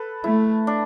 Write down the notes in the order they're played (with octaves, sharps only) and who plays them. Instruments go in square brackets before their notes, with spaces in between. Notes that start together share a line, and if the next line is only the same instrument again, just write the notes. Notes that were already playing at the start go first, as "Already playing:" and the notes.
Already playing: [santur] A4 B4
[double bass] A3 [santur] E4
[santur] D4